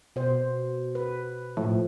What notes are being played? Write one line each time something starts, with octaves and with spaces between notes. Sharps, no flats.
B2 C5
B4
A2 F3